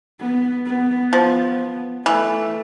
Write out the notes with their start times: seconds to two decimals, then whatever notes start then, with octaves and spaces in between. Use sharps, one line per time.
0.20 B3
0.66 B3
1.12 F3 B3
2.05 E3 A3